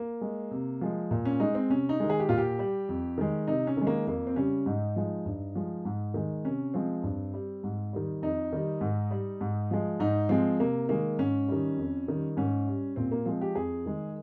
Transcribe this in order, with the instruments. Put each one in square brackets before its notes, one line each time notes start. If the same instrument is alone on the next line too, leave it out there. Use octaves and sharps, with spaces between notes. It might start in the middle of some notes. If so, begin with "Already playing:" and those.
Already playing: [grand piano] A#3
G#3
C3
F3 G#3
A#2
C#4
G#3 D#4
C4
C3 C#4
D#4
D#3 G#3
G#4
G4
A#2 F4
G4
G3
F2
D#3 G#3
C3 D#4
C#4
D#3 G#3
A#3
F2 A#3
C4
C#3 G3 C#4
G#2 D#4
F3 G#3
G2
F3 G#3
G#2
D#3 G#3
C3 C#4
F3 G#3 C4
G2
G3
G#2
D#3 G3
F2 D#4
D#3 G3
G#2
G3
G#2
F3 G#3
G#2 D#4
F3 G#3 C4
C3 A#3
D#3 G#3 A#3
G#2 C#4
D#3 G3
F2
D#3 G3
G#2 C#4
G3
A#2 C4
A#3
F3 G#3 C4
G4
F2 G#4
D#3 G#3